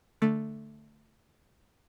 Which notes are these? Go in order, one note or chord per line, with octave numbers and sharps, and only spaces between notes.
D3 A3